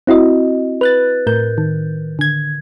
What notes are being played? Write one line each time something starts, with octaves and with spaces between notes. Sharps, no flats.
C4 E4 F#4 D#5
B4 F#6 A6
A2 A#4 G6
D#3
D3 G#6